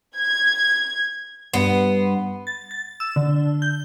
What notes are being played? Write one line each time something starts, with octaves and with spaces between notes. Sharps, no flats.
G#6
G2 B3 C6
A6
A6
E6
D3
G6